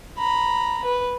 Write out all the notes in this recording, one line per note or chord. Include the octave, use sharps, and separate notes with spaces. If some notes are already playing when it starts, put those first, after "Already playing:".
A#5 B5
B4